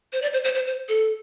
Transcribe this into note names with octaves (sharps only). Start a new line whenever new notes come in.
C5
D5
C5
C5
C5
C5
A4